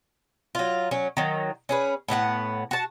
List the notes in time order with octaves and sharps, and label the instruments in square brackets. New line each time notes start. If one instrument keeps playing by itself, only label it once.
[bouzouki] F#3 F4
F#3 C#4
D#3 F#3
C#4 G#4 B4
A2 B3 F#4 F#5
F#4 A5